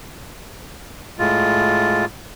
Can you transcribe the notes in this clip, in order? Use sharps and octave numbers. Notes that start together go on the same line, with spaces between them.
A2 G#3 F4